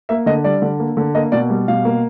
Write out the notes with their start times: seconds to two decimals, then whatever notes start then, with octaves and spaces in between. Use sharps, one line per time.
0.09 A#3 E5
0.26 D3 D#5
0.44 G3 D5
0.62 D3
0.80 A#3
0.97 D3
1.15 A#3 D#5
1.32 B2 D5
1.50 G3
1.68 B2 F5
1.85 A#3